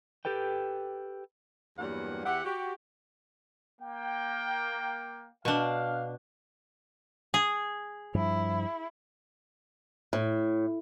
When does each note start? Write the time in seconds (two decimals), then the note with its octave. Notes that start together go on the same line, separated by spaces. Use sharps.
0.25 G4 A4 B4 G5
1.78 E2 G2 F#3 G3 A#3 F#5
2.26 E2 G4 E5 F#5
2.45 F#4 G4
3.81 A#3 G5
5.45 B2 D4 F5
7.34 G#4
8.14 G2 F3 E4
10.13 A2